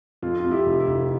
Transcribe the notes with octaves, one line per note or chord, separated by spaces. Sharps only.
F2 F4
F2 F4
E4 G4
F1
E4
F1